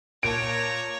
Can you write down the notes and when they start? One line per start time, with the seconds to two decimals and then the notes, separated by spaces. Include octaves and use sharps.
0.23 A#2 C#5 A5 A#5 D7